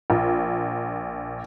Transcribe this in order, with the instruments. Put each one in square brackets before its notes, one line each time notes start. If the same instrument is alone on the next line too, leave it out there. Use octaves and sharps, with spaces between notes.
[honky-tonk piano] A#1